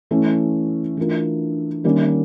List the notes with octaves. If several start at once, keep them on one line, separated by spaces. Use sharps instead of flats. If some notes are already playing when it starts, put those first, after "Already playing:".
E3 A3 C#4
E3 A3 D4 F4 A#4
D#3 G3 A#3 C#4